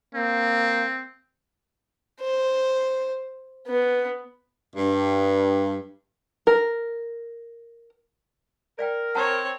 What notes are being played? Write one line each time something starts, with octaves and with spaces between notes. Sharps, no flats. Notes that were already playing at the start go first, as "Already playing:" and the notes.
A#3 C4
C5
B3
G2
A#4
A#4 D5 F5 G5
C4 C#5 F#5 A5 A#5